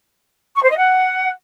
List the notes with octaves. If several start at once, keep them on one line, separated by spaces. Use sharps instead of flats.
C#6
C5
D#5
F#5